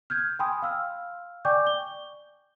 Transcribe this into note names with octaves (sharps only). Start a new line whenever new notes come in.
F6 G6 G#6
G5 G#5 B5 C6 D#6
F5 E6 F6
D5 G5 G#5 C#6 D6 G6
G7